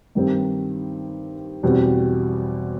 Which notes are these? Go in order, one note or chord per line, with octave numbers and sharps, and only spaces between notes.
G2 D#3 G3 C4 D#4
E2 B2 G3 C4